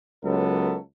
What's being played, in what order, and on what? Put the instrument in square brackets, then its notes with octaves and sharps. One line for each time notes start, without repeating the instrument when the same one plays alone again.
[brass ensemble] C#2 F#3 B3 A4 A#4 C#5